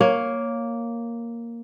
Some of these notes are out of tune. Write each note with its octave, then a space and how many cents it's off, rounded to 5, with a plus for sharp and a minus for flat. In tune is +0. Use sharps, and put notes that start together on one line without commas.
A#3 +0 C#5 +0